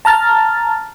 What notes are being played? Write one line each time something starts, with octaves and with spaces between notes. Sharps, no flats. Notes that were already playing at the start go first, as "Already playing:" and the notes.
A5 A#5 F6 A6